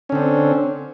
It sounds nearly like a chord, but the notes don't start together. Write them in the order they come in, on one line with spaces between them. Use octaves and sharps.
C#4 D3 C4